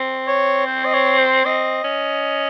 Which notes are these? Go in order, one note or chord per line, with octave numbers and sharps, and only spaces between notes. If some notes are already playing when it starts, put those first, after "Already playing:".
Already playing: C4
C#5
C5
D#5
C#5
C5
C4 D#5
C#4